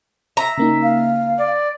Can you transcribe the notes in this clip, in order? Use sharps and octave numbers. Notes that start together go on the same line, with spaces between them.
E5 A#5
C#3 A#3 D#4
F5
D5